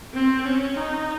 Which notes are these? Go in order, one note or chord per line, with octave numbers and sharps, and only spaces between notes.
C4
C#4
D#4